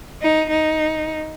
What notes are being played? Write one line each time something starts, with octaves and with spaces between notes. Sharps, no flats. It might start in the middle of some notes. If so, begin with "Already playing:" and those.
D#4
D#4